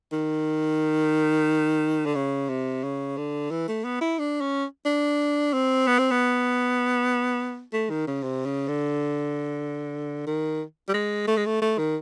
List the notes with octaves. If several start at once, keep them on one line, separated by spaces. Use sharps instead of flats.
D#3
D3
C#3
C3
C#3
D3
E3
A3
B3
E4
D4
C#4
D4
C4
B3
C4
B3
A3
D#3
C#3
C3
C#3
D3
D#3
G3
G#3
A3
G#3
A3
A3
D#3